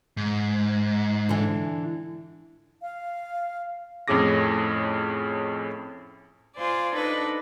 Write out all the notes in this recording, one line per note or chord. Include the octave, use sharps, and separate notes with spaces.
G#2
D3 E3
F5
F2 A2 C#4 G#4 D6 A#6
F4 C5 D5 G#5
D4 D#4 A4 B4